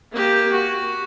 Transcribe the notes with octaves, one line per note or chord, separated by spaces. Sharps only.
A#3 G4
F#4